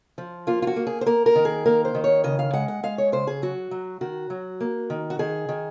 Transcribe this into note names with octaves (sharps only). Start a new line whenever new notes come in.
F3
A#3 F4
F4
F#4
A#3
G#4
C5
A#3 A#4
A#4
D#3
G#4
A#3 A#4
C5
D#3
C#5
C#3 D#5
F5
G#3 F#5
F#5
G#3 F5
C#5
C#3 C5
G#4
F#3 F#4
F#3
D#3 F#4
F#3
A#3
D#3
F#4
D#3 G#4
D#3